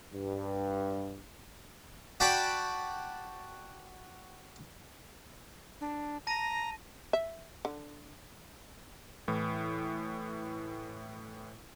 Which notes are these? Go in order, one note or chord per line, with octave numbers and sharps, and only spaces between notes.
G2
F#4 D5 G5 A5 B5
D4
A5 A#5 A#6 D#7
E5
D3
A2 E3